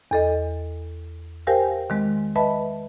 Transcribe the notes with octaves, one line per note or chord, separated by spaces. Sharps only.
E2 A4 D#5
G4 A#4 C5 F5 G5 G#5
D#3 G#3 C4
B4 D#5 E5 A5 B5